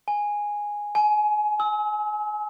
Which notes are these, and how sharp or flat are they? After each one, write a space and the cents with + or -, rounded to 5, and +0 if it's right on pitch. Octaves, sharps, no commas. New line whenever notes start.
G#5 -5
G#5 +25
E6 -40